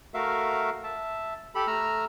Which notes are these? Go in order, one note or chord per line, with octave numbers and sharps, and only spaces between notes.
A3 F#4 A#4 E5 F5
E5 A5
G4 A4 B5
A3 A#5 E6 F6